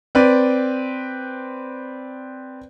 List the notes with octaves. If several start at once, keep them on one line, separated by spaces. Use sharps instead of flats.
C4 B4 D5